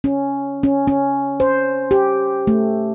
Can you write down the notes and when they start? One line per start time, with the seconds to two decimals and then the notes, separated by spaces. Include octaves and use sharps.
0.04 C#4
0.63 C#4
0.88 C#4
1.40 C5
1.91 G4
2.47 A3